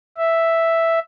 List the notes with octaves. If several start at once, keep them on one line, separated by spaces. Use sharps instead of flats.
E5